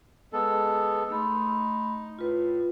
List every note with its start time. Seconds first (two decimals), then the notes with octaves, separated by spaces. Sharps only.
0.33 G#3 B3 A4
1.10 A3 D#4 B5 C6
2.19 A2 F4 B4